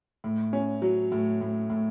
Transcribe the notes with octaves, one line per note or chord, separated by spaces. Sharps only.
A2
C#4
F#3
A2
A2
A2